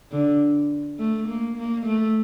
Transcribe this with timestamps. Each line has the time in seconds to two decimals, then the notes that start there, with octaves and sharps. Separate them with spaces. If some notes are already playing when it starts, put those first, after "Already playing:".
0.12 D3
0.99 A3
1.28 A#3
1.57 A#3
1.86 A3